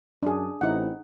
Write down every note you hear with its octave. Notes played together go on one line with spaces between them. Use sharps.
F#2 D4 G#4
A1 C4 D#4 E4 F#5